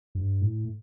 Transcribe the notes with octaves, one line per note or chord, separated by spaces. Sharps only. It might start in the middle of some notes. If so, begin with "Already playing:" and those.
G2
A2